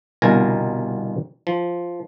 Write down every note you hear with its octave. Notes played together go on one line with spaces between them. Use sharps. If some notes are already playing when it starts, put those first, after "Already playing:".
G1 C2 B2 A#4 G#5 A#5
F3